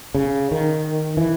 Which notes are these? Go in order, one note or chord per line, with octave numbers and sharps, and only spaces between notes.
C#3
D#3
E3